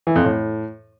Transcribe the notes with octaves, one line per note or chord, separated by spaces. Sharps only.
E3
F2
A2